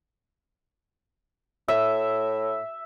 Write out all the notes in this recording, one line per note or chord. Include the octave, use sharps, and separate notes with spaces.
A2 E5